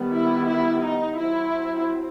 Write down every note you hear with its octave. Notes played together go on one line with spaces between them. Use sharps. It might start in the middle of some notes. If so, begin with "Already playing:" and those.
Already playing: D#3 G3 B3
E4
E4
D#4
F#3 C4 E4